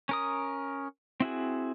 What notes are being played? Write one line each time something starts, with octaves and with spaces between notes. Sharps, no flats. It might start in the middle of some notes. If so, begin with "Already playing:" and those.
C#4 A#4 D#6
C4 E4 F#4 G#4